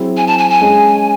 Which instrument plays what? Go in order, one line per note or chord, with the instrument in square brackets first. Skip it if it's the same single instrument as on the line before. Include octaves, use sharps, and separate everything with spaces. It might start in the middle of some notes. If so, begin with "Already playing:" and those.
Already playing: [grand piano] F#3 C4 E4 G#4
[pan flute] G#5
A5
G#5
G#5
[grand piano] G#3 C#4 G#4